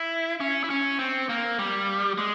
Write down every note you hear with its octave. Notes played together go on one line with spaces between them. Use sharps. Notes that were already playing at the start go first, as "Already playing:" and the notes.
Already playing: E4
C#4
E4
C#4
C4
A#3
G3
G#3